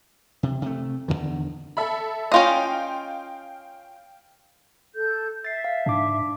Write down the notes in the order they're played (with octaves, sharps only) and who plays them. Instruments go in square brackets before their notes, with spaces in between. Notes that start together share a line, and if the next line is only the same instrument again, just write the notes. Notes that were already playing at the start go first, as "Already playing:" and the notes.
[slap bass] C3
C3 A3
E2 B2 D3 D#3
[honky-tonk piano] A4 E5 B5
[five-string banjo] C#4 F4 D#5 [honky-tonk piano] F5 G5
[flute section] A4 G6
[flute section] E5 [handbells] A6 C7
[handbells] F5
[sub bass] G#2 [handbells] D4 D6